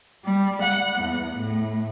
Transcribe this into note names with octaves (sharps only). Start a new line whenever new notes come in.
G3
F#5
E2
A2